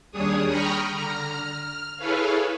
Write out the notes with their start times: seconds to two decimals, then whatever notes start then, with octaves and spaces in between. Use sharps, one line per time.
0.11 D#2 G3 D4 G#4 C#5 D#6
0.48 G5 A#5 B5 C#6 D#6 F6
0.91 D3 A#5 F6
1.34 F6
1.97 E4 G#4 A4 B4 C#5 F5